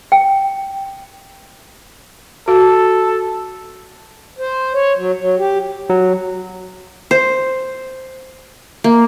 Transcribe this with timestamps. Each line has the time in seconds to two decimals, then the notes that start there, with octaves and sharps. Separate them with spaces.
0.12 G5
2.48 F#4 A4
4.39 C5
4.74 C#5
4.97 F#3
5.19 F#3
5.38 G4
5.90 F#3
7.11 C5
8.84 A#3